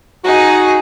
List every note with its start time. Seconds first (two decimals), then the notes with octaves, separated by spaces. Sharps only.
0.24 D#4 F#4 G#4